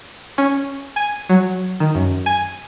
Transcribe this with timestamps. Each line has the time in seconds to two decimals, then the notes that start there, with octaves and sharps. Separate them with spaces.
0.38 C#4
0.96 G#5
1.29 F#3
1.80 D#3
1.95 F#2
2.26 G#5